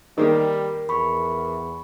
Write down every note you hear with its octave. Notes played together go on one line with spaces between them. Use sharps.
D#3 G3 A#3 G4 A#4
E2 B5 C#6